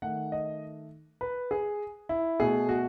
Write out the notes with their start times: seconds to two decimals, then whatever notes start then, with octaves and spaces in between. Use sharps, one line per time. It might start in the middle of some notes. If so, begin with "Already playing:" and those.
0.02 D#3 A3 F#5
0.32 D#5
1.21 B4
1.51 G#4
2.09 E4
2.40 B2 A3 G#4
2.69 F#4